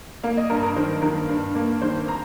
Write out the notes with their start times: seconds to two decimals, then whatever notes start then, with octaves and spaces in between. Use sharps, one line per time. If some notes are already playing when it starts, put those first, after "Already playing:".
0.23 A#3 F5
0.37 D#5
0.50 G2 A#4
0.63 A#4
0.76 D#3 C5
1.02 D#3 A#4
1.29 G2
1.55 A#3
1.82 D#3 C5
2.08 A#5